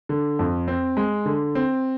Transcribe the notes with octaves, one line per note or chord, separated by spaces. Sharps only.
D3
F2
C4
G#3
D3
C4